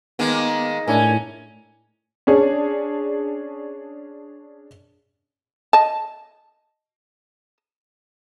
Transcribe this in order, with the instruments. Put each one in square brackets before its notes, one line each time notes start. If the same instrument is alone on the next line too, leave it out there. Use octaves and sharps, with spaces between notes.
[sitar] D#3 G#3 A#3 [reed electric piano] B3
[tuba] A2 [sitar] C#4 [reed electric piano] D4 E4 A#4 [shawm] G#5
[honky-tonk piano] C#4 D4 G#4
[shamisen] D#5 A5